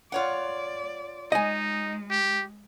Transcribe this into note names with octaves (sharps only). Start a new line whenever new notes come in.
F4 C#5 D5 F#5
G#3 D#4 D#5 G#5
G4